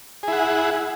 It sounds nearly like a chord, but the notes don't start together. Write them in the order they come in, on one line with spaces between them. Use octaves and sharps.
G#4 E4 F#5